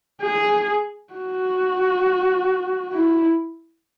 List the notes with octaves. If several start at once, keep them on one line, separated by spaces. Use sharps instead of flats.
G#4
F#4
E4